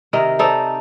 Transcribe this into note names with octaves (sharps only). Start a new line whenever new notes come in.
C3 D#3 A#4 D#5
D#4 A4 C5 D5